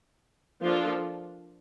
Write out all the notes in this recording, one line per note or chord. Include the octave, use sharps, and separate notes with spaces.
F3 A#3 D4 F4 A4